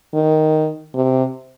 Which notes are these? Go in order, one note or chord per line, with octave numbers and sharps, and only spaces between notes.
D#3
C3